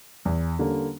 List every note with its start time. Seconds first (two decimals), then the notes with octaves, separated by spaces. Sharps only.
0.25 E2
0.59 D3 G3 A#3 C#4